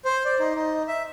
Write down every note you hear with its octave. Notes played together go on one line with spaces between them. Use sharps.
C5
D5
D#4
D#4
E5